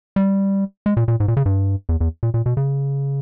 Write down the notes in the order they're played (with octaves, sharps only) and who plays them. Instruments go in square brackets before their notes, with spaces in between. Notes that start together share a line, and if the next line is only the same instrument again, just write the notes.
[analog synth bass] G3
G#3
A#2
A#2
G#2
A#2
C#3
G2
E2
E2
A#2
A#2
B2
C#3